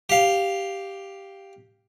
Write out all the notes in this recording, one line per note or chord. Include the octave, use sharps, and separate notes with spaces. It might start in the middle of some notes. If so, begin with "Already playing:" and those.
G4 F5